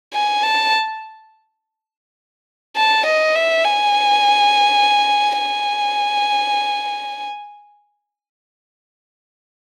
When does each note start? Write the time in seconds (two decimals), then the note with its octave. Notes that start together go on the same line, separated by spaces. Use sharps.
0.14 G#5
0.43 A5
2.77 A5
3.06 D#5
3.35 E5
3.65 G#5
5.39 G#5